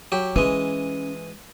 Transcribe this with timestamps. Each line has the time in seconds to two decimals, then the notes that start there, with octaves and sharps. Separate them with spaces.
0.12 F#3 G4
0.36 E3 G#3 C#4